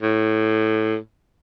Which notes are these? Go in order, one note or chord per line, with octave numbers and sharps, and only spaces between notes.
A2